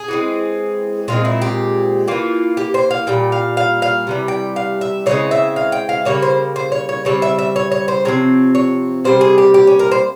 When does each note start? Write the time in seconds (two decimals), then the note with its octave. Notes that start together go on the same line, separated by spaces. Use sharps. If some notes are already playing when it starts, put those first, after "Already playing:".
Already playing: G#4
0.08 E3 G#3 C4
1.08 A#2 G#3 C4 F4
1.25 E4
1.42 G4
2.08 E3 A#3 F4
2.57 G4
2.74 C5
2.91 F5
3.07 A#2 G3 G5
3.32 F5
3.57 F5
3.82 F5
4.07 C3 E3 G3
4.28 G5
4.56 F5
4.81 E5
5.06 C#3 E3 G#3 C4 C#5
5.31 E5
5.56 F5
5.72 G5
5.89 F5
6.05 C#3 G3 A#3 C#5
6.22 C5
6.56 C5
6.72 C#5
6.89 C#5
7.05 C#3 G3 C4 C#5
7.22 E5
7.39 E5
7.56 C#5
7.72 C#5
7.88 C5
8.05 C3 F3 C4 C#5
8.55 C#5
9.04 C3 G3 A#3 C5
9.21 G#4
9.38 G4
9.54 G4
9.67 C#4
9.79 A#4
9.91 C5